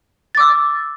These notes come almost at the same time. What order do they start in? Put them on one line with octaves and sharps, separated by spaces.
A6 D6 E6